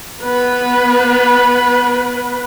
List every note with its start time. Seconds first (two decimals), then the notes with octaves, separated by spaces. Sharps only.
0.21 B3 B4